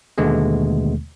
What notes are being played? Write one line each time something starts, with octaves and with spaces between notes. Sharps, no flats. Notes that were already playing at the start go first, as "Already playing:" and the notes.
D#2 B2 D3 G#3 A3 B3